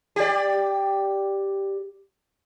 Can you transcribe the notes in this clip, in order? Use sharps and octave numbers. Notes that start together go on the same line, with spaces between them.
G4 D5